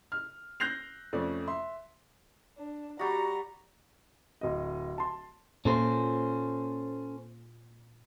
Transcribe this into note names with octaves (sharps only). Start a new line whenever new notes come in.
F6
F#6 G6 A#6 C7 F7
F2 A3 C#4 D5
E5 C6
D4
G3 F#4 A#5
D1 D#5
A5 C6
A#2 C#4 A4 C5